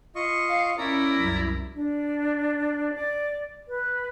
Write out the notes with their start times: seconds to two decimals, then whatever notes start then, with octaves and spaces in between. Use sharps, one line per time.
0.15 F4 D#5 C#6
0.48 F5
0.78 C#4 E4 A#4 D5 A#5
1.20 C2 F#2
1.75 D4
2.94 D5
3.68 B4